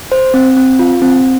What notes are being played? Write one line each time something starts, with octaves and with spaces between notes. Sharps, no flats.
C5
C4
C4
F4
C4